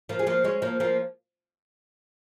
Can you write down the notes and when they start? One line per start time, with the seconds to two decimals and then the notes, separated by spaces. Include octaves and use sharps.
0.09 F3 A#3
0.19 G#3
0.27 F3 A#3
0.44 G#3 C#4
0.62 F3 A#3
0.80 F3 A#3